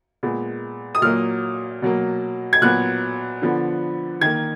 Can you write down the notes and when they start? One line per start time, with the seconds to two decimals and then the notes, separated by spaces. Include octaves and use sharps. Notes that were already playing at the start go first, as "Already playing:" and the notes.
0.23 A#2 G#3 B3
0.95 D#6
1.02 A#2 F#3 A#3 F6
1.82 B2 F#3 A#3
2.53 G#6
2.62 A#2 F#3 B3 F#6
3.42 D3 F3 B3
4.21 D#3 G#6
4.26 A#3